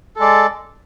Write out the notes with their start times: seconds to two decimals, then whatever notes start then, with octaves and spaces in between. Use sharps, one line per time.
0.16 A4
0.19 G#3
0.21 D5